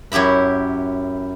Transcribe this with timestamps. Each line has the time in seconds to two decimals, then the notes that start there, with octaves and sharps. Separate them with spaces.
0.12 F#2 E4 G4 E5 B5